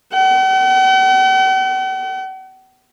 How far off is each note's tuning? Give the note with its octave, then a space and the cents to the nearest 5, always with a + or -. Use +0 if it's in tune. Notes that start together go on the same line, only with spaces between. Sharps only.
F#5 +45